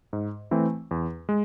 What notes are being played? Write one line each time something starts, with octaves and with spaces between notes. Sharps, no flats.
G#2
E3 A3 C4
E2
G#3